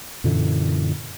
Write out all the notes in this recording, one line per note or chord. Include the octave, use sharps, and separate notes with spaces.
F#2 A#2 D3 E3